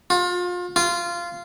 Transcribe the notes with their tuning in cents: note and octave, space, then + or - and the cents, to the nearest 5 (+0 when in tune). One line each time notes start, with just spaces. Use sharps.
F4 +30
F4 -15